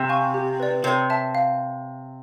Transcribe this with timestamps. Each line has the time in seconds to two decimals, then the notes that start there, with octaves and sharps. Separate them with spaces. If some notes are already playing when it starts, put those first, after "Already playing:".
Already playing: C3
0.09 F5 G#5 C#6
0.34 G4
0.60 B4 D5
0.84 C3 C#5
1.10 E5 A5
1.35 F5